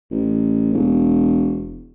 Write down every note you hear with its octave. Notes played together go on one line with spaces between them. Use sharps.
A1
E1